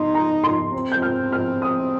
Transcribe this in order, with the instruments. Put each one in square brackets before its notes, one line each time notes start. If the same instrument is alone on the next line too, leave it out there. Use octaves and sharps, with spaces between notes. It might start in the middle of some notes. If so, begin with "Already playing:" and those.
Already playing: [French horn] D#4 [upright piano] C6
[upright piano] A#5
C6
[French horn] C4
[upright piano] G6
F6
F6
D#6